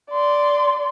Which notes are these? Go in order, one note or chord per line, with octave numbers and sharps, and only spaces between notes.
D5 C6